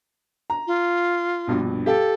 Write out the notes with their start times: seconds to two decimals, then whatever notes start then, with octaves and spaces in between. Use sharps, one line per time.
0.50 A#5
0.67 F4
1.47 A#1 G2 B2
1.86 G4 A4 F5 G5